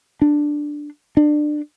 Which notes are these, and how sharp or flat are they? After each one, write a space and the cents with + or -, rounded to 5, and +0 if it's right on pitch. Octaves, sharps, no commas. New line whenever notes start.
D4 +5
D4 +25